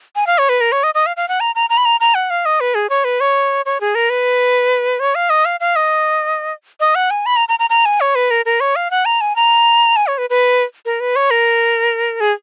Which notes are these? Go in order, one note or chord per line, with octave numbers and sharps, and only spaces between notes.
G#5
F5
C#5
B4
A#4
C#5
D#5
D#5
F5
F5
F#5
A#5
A#5
A#5
B5
A#5
A#5
F#5
F5
D#5
B4
G#4
C#5
B4
C#5
C#5
G#4
A#4
B4
C#5
F5
D#5
F5
F5
D#5
D#5
F#5
G#5
B5
A#5
A#5
A#5
A#5
G#5
C#5
B4
A#4
A#4
C#5
F5
F#5
A#5
G#5
A#5
G#5
C#5
B4
B4
A#4
B4
C#5
A#4
G#4